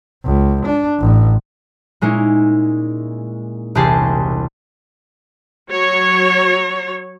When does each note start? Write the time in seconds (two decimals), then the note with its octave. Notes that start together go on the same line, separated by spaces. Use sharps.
0.25 C#2
0.66 D4
1.00 A1
2.01 A#2 G#3 C#4 D#4 E4
3.75 E1 C2 G4 G#4 A5 C6
5.71 F#3 C#5